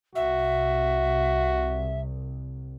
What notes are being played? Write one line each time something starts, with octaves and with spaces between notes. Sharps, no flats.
C2 F#4 E5